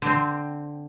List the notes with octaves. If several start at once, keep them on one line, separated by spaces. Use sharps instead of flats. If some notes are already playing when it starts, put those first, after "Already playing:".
D3 C4